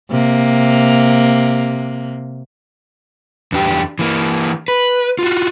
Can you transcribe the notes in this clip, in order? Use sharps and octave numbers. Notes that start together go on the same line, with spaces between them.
C3 A#3
E2 D4 G4
E3 A#3
B4
F4 F#4